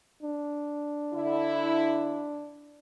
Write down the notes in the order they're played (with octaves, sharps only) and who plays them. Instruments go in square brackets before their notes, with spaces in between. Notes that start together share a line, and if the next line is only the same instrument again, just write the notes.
[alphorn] D4
[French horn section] D3 E4